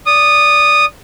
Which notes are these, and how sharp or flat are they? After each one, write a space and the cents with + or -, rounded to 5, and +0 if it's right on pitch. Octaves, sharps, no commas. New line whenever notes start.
D5 -15 D#6 -15